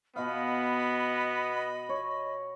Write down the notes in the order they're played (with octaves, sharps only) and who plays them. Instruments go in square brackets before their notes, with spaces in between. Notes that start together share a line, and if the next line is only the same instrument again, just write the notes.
[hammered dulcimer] B2 F5 [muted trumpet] B3 [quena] D#5 [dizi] B5
[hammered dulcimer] C#5